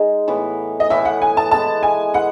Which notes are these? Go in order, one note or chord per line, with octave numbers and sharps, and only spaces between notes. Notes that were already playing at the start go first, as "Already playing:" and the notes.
Already playing: G#3 D#4 G#4
A2 E3 B3
D#5
A2 E3 B3 E5
F#5
G#5
A5
G#3 B3 E4 A5
G#5
G#3 B3 E4 F#5